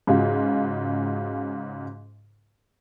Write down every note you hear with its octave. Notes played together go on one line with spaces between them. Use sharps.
G#2 C#3 F4 F#4